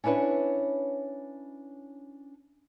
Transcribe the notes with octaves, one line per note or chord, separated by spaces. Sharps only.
C#4 D4 E4 B4 C#5